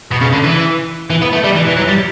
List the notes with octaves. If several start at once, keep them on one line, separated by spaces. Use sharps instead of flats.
B2
C#3
D3
E3
E3
B3
A3
G3
E3
E3
F#3
G3